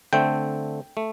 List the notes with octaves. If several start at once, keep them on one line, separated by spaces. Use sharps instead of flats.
D3 A3 C4 G5
A3